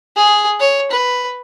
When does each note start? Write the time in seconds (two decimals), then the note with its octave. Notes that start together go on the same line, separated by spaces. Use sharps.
0.17 G#4
0.60 C#5
0.91 B4